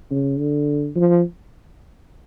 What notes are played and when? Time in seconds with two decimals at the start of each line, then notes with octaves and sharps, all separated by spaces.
0.10 C#3
0.38 D3
0.96 F3